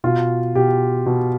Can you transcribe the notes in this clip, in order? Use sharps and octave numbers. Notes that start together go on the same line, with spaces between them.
B2 F4
B2 G4
B2